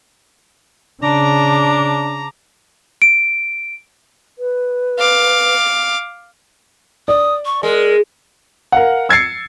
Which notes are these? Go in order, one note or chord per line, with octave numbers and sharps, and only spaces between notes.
C#3 D4 A5 A#5 D6
D7
B4
F5 D6
D5 D#6
C#6
G#3 A#4
A#4 F5 F#5
E6 G#6 A6 C7 C#7